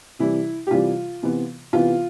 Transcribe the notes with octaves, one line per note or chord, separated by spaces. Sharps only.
C3 E3 G3 E4
G4
C3 E3 G3 F4
C3 E3 B3
C3 E3 B3 F4